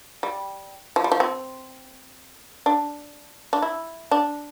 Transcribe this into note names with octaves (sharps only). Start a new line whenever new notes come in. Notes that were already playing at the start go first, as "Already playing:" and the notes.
G3
F3
G3
F3
C4
D4
D4
E4
D4